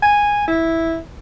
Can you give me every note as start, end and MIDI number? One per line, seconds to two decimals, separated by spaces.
0.02 0.45 80
0.48 0.97 64